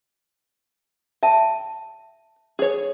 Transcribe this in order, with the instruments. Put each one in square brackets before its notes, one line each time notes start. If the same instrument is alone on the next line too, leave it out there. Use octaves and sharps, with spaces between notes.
[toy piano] E5 A5 [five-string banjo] G5
[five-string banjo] G#4 C#5